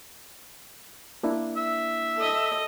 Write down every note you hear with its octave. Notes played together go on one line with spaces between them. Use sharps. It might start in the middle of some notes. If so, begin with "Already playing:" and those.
A#3 D4 E4
E5
A4 D#5